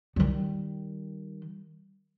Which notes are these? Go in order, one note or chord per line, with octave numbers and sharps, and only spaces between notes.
D#3 G3